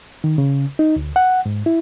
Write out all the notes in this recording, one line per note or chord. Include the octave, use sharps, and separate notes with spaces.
D#3
C#3
D#4
D2
F#5
G#2
E4